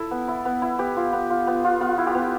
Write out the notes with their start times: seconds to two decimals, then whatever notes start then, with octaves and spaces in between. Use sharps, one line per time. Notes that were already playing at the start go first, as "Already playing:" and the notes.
Already playing: E4 A4
0.11 B3
0.28 E4
0.45 B3
0.62 E4
0.79 B3 G4
0.97 F4
1.13 B3
1.30 F4
1.47 B3
1.64 F4
1.81 B3 F4
1.98 E4
2.07 G4
2.15 B3